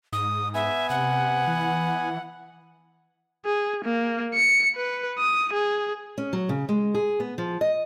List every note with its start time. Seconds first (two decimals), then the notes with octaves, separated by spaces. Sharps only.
0.13 G#2 D#6
0.54 B3 E5 G#5
0.90 C3 F#5
1.47 E3
3.46 G#4
3.85 A#3
4.34 C#7
4.75 B4
5.19 D#6
5.53 G#4
6.18 C#4
6.33 F#3
6.49 C#3
6.69 G#3
6.94 G#4
7.20 B3
7.38 F3
7.61 D#5